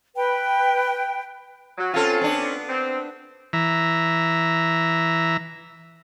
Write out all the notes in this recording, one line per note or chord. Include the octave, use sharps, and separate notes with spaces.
B4 G5
F#3
C4 C#4 F4 A4
B3 D4
C4
E3 E5 A#5